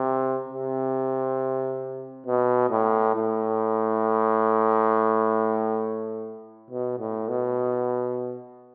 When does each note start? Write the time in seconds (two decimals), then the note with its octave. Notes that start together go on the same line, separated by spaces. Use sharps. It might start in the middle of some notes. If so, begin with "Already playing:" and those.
Already playing: C3
0.49 C3
2.26 B2
2.70 A2
3.15 A2
6.70 B2
6.99 A2
7.29 B2